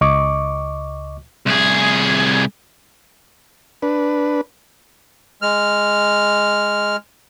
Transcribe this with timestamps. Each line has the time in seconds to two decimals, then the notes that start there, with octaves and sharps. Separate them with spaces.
0.01 C#2 D#5 C#6 D6
1.46 C2 G#4
3.82 D4 B4
5.42 G#3 F6